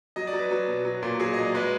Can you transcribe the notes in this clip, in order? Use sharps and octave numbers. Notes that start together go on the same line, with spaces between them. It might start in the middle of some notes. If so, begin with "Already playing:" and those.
F#3 D#5
D5
F#3
B4
F#3
B2
F#3
A#2
F#3 G#4
F#3 D#5
D5
G#3 B4